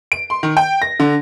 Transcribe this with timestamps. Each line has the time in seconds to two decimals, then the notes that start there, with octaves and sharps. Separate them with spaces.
0.12 D7
0.30 C6
0.43 D#3
0.57 G5
0.82 A#6
1.00 D3